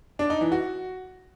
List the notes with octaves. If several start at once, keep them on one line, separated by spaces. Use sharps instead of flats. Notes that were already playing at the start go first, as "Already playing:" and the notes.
D4
D#4
E3
F#4